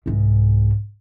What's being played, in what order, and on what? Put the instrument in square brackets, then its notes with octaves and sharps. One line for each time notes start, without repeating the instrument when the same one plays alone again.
[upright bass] C2 G#2